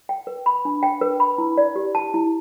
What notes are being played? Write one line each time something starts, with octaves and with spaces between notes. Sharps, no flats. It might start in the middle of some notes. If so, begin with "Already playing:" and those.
G5
B4
B5
D4
G5
B4
B5
E4
D5
G4
A5
E4